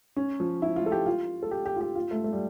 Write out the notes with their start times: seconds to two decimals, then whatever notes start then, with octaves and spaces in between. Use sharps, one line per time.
0.16 C#4
0.40 F3
0.62 E4
0.76 F4
0.86 A4
0.92 G4
1.06 F4
1.43 A4
1.51 G4
1.66 G4
1.76 F4
1.81 G4
1.96 F4
2.11 A3
2.24 A3
2.33 G3